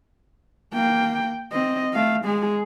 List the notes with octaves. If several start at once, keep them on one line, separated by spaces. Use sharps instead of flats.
A#3 G5
C4 D#5
A3 F5
G#3 G#4